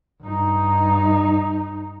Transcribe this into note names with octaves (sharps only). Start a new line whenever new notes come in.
G2 D#4